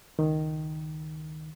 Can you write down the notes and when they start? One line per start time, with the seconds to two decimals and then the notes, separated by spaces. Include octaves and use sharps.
0.19 C#2 D#3